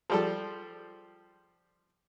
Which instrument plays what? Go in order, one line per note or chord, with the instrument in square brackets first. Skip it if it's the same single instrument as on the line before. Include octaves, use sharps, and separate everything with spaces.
[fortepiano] F3 G3 A4